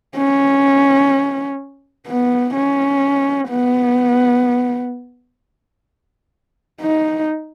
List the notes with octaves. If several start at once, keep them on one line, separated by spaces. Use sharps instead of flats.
C#4
B3
C#4
B3
D#4